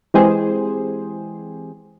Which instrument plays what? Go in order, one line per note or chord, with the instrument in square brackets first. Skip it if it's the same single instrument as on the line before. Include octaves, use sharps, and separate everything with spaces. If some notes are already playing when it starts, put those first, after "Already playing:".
[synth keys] E3 G#3 C4 G4 G#4 C5